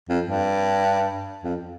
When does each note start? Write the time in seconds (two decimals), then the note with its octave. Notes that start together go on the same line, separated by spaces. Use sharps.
0.09 F2
0.24 G2
1.43 F2